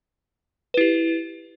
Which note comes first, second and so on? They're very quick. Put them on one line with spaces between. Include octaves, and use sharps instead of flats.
B4 E4 G4